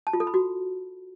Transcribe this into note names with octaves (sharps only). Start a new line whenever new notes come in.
A5
F4
A4
B5
F#4